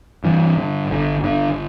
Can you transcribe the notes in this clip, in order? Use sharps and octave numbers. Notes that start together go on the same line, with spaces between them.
G2 E3
D3
G1 D3
G1 D3